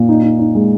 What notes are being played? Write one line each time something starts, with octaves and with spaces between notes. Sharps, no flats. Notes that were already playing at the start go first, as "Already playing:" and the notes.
Already playing: A#2
D#4
D#4
D#4
G#3